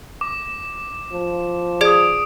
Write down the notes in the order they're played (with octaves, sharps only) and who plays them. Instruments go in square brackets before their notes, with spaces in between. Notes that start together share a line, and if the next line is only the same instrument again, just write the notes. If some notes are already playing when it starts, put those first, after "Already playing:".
[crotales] D6
[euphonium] F3
[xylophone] G#4 D5 G#6 [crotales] D#6 D7